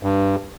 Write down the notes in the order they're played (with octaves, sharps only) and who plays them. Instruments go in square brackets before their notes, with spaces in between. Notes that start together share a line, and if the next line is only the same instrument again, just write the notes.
[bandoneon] G2